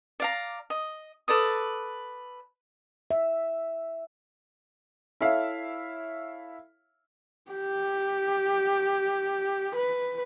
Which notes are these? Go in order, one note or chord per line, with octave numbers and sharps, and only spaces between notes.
D5 F5 A#5
D#5
A4 B4 D5 D#6
E5
E4 A4 C#5 E5 F5
G4
B4